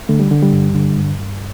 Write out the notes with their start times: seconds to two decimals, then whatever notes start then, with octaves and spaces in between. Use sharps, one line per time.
0.09 D3 A3
0.20 G3
0.31 D3
0.43 G3
0.52 G2
0.75 D3
0.97 G2
1.19 G2